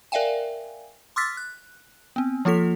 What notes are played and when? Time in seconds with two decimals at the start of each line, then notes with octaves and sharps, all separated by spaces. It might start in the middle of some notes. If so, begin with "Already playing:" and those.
0.12 A#4 D5 E5 F5 G5 G#5
1.16 C6 D6 E6 F6 A6 B6
1.37 F#6
2.16 B3 C4
2.45 F3 A#3 F4 A4 B6 F7